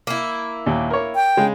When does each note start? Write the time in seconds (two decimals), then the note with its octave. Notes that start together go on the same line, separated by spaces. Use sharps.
0.07 A#3 E4
0.66 D#2 A#2
0.90 A#4 C#5
1.15 G5
1.37 C#3 G#3